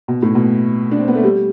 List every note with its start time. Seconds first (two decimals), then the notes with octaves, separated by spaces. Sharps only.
0.08 B2
0.22 A2
0.35 B2
0.91 D4
0.99 C4
1.08 B3
1.15 A3
1.24 G3